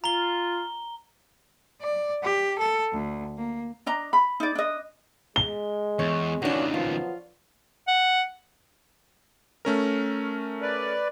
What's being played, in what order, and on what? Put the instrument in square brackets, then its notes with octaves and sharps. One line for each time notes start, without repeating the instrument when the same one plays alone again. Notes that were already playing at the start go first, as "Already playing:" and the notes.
[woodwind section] F4 [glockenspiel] A#5 G7
[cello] D5
G4
A4
D2
A#3
[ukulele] D4 D#5 A#5
B5
D#4 D5
D4 D#5
[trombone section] G#3 [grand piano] G7
[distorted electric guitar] E2 [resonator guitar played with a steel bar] C#5
[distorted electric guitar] C#2 D#3 [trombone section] E3 C#4 [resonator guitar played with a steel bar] D4 F#4
[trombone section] F3 F#3 B3 [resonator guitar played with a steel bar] F4
[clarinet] F#5
[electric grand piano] A3 C#4 A#4
[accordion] B4 D5